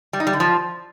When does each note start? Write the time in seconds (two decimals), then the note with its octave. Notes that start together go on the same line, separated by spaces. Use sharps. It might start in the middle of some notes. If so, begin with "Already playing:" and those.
0.13 G3
0.20 D#4
0.27 G3
0.33 D3
0.40 F3